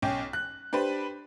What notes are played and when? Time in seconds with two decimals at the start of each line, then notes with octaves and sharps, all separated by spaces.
0.02 B1 C#4 G5
0.33 F#6
0.73 D4 G4 B4 C5